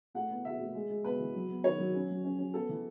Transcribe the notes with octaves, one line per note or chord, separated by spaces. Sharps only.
A2 F#5
B3
B3 E5
A2
G#3
G#3
B3 B4
E3
F#3
B3
D#3 C#5
F#3
C#4
F#3
C#4
C#4
B3 A4
E3